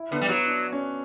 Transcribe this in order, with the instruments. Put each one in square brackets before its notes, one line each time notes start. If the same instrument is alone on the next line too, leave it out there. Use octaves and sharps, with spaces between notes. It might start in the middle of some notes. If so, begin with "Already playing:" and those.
Already playing: [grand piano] E4
[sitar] D3 [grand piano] B3
[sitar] G3
[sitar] F#3 [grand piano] F#4
[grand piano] D4
C#4